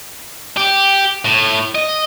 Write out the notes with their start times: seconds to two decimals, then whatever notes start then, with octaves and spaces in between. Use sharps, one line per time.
0.57 G4
1.25 A2
1.75 D#5